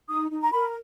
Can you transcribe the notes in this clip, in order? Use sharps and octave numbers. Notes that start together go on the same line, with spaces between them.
D#4 D#6
D#4
A#5
A#4 B5